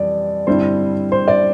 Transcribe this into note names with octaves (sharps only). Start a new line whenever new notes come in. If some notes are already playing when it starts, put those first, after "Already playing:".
Already playing: F2 E3 G3 D5
G2 D3 G3 C4 E4 C5
C5
D5